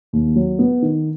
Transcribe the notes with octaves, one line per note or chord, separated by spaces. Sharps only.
D#2
F#3
B3
D#3